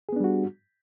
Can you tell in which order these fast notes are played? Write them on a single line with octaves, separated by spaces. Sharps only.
G#4 B3 D4 G3 F#4